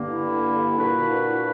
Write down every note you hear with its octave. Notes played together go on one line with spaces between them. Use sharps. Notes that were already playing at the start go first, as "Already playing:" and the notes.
Already playing: G2 D3 A#3
E4
A#2 A#3 D4 F#4 B4